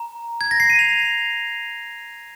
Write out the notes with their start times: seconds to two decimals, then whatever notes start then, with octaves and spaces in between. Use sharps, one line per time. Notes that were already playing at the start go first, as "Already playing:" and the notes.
Already playing: A#5
0.41 G#6
0.51 A#6
0.60 C7
0.70 D#7
0.79 F7